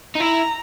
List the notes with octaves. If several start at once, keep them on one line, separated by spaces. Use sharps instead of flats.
D#4
E4 A#5